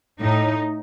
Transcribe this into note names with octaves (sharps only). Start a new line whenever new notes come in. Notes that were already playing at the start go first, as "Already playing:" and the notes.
A2 D#4